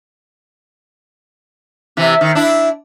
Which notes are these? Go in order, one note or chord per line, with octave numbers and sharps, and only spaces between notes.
C3 E3
D#3
D4 E4